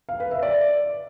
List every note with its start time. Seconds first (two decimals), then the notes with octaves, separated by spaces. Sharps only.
0.09 F5
0.20 B4
0.31 E5
0.43 D5